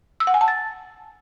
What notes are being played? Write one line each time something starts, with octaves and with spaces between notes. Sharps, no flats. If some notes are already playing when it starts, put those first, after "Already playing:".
E6
F#5
G#5
A5
A6